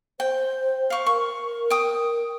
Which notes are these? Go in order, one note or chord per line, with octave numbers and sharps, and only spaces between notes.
C5 G5
F5 C#6
A#4 C#6
G5 D#6